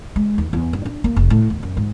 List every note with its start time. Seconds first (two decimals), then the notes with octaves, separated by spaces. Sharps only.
0.16 G#3
0.38 D#2
0.53 E2
0.73 G2
0.85 D4
1.04 A#3
1.16 F1
1.30 A2
1.50 D#2
1.63 F#2
1.77 G#2